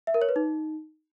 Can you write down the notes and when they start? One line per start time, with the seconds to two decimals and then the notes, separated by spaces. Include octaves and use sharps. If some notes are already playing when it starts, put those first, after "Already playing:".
0.07 E5
0.14 A#4
0.22 C#5
0.29 B4
0.36 D#4